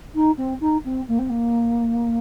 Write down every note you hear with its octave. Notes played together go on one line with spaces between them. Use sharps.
D#4
C4
D#4
C4
A#3
C4
A#3